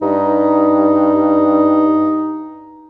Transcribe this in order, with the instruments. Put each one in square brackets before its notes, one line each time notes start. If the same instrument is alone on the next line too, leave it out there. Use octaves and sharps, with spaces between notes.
[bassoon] G2 [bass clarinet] D#4